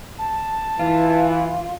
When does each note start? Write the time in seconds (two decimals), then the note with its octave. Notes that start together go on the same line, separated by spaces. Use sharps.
0.19 A5
0.79 E3 F4